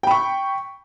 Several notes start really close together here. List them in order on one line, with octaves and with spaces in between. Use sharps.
G5 B5 C#6